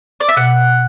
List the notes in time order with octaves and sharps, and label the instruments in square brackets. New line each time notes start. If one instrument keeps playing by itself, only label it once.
[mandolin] D5
E5
[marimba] B2 [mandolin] F#5